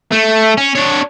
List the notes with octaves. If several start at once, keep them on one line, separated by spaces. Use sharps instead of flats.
A3
C#4
D4 C#5